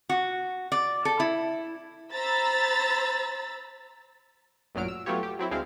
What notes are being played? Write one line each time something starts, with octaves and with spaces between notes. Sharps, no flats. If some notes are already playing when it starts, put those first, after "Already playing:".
F#4
D5
A4
E4
C5 A#5 B5 E6 A6
A1 F#2 A#2 F#3 F6 D7
E6
F#3 A3 B3 F4 G4 C#5
G4
F#3 C4 E4
D2 G#3 C4 E4 F5